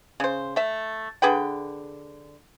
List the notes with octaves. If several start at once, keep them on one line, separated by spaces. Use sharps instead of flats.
C#3 C5
A3 E5
D3 G#4 B4 G5